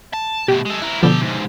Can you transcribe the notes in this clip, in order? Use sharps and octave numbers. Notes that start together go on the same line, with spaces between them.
A5
B2 A3 G4
G#3 A4
E4 A#4 F#6
B2 D3 F3 G4 A4
G#2 C3